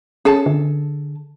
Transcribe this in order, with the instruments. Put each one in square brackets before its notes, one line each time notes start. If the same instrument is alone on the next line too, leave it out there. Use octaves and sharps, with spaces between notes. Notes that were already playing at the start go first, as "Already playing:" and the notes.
[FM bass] C#4 [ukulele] G#4 A4 A5
[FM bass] D3